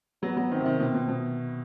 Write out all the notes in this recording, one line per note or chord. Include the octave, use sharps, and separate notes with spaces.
F#3 B3
F#3
D#3 C4
C3
D#3
B2 C4
B2
B2